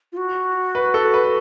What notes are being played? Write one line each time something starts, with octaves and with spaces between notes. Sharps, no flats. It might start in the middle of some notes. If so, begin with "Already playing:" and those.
F4
F#4
B4
A4
B4